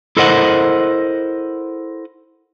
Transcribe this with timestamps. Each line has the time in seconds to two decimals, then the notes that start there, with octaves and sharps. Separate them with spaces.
0.17 E4 A4 A#4 C5 D#5 F#5